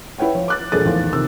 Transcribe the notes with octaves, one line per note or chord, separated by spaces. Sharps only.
E4 B4 C#5 F#5 G5
F3 C#5
D6 F#6 A6
E1 A#1 A#2 G#4 A4 A6
E2 A2 D#3 F3
C3 D#3 E6